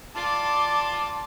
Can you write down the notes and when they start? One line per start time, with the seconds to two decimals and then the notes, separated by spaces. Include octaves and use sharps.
0.15 F4 D5 A5 D6